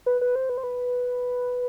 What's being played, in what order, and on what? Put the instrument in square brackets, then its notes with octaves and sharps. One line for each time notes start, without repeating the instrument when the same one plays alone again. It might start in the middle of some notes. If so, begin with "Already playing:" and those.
[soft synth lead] B4
B4
C5
B4
C5
B4